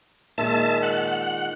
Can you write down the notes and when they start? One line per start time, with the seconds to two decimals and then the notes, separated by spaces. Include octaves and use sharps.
0.38 A#2 D#3 G#3 E5 A5
0.82 F#5